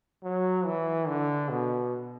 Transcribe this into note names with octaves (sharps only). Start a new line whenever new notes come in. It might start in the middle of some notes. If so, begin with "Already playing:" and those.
F#3
E3
D3
B2